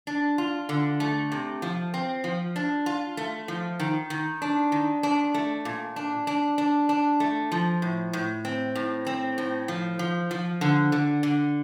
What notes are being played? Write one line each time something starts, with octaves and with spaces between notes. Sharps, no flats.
D4
F4
D3
A3
C3
F3
C4
F3
D4
F4
A3
F3
D#3
D#3
D4
D#3
D4
A3
A#2
D4
D4
D4
D4
A3
F3
A2
A2
C4
A2
C4
A2
F3
F3
F3
D3
D3
D3